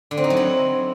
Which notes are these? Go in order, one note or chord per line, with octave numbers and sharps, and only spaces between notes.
D3
C4
D#4
F#3
E4